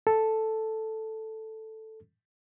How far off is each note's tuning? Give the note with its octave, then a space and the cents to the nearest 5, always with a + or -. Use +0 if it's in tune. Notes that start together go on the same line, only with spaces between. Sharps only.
A4 +0